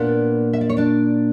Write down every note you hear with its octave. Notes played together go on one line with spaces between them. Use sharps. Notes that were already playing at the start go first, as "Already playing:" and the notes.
Already playing: A#2 A#3 B3 D4 B4
E5
D5
C#5
D4 D5